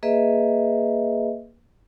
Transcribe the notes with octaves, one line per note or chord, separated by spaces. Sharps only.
A#3 G#4 B4 D#5 E5